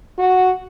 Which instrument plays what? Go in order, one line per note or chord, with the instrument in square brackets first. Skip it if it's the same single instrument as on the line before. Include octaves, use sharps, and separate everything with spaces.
[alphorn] F#4